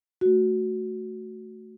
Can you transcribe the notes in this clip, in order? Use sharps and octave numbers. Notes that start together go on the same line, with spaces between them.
A3 F#4